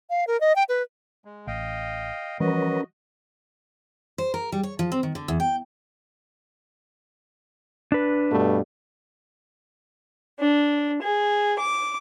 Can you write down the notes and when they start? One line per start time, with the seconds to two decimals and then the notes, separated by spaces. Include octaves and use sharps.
0.10 F5
0.27 A#4
0.41 D#5
0.56 G5
0.69 B4
1.25 G#3
1.47 A1 D#5 F5 G5
2.40 E3 F3 G3 C#4 F#4 A#4 B4 D#5
4.18 C5
4.34 A#4
4.52 G3
4.63 C#5
4.79 F3
4.92 C4
5.03 D#3
5.15 D3
5.28 E2
5.40 G5
7.92 D4 B4
8.30 G2 B2 A3
10.40 D4
11.02 G#4
11.59 D6